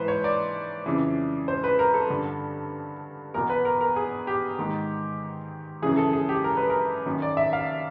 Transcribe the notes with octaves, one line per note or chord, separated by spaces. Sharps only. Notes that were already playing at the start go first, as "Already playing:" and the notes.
Already playing: G#2 E3 B4 C5
C#5
D5
F2 C#3 E3
C5
B4
A#4
A4
G2 D3
E2 B2 A#4
B4
A#4
A#4
G#4
G4
G#2 D#3
F#2 C#3 E3 G#4
A4
G#4
G4
A#4
B4
A#4
F#2 D#3
D5
E5
F5